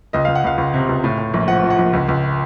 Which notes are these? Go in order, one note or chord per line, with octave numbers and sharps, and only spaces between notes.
C#2 D#5
C#2 F5
F#5
C#2 F5
C#2
C3
C#2
A2
A2
A#1
F3 F#5
F3
F#5
A#1
C#2
C#2